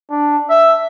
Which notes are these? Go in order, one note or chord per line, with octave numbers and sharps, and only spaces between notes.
D4
E5